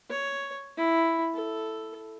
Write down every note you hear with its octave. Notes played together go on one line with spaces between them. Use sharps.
C#5
E4
A4